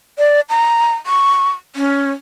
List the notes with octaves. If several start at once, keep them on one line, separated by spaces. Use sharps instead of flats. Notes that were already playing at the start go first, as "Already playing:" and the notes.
D5
A#5
C#6
C#4